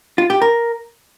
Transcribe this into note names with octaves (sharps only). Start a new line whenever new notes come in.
F4
G4
A#4